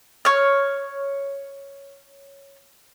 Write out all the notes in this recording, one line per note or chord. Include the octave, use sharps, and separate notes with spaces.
C#5 F6